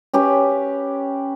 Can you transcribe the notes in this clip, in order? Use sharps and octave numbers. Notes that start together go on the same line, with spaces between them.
C#4 G4 B4